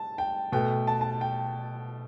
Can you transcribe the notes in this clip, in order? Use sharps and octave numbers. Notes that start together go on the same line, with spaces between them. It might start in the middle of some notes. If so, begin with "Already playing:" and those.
Already playing: A5
G5
B2 A3 G5
A5
A5
G5